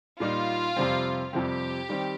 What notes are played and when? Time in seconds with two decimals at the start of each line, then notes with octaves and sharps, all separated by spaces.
0.19 A#2 G3 A#3 D#4 F4
0.77 F2 C3 G3 C4
1.33 F2 C3 G3 C4 G4
1.89 D#3 G3 C4